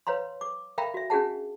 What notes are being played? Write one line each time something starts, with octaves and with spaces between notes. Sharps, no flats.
B4 C#5 F5 A#5 C6
D6
A#4 E5 F5 G5 A#5 B5
F#4 E5
C#4 D4 F#4 G#4 F#5 A5